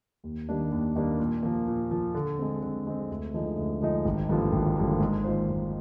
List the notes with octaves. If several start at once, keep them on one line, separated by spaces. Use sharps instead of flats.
D#2
D#3 G3 A#3 D4
D#2
D#3 G3 A#3 D4
A#2
F3 A#3
A#2
F3 A#3
D3
G#3 C4
D3
G#3 C4
D2
D3 F3 G#3 D#4
D2
D3 F3 G#3 D#4
G#1
G2 D3 F3 A#3
G#1
G2 D3 F3 A#3
G#2
D#3 A#3 F4 C5
G#2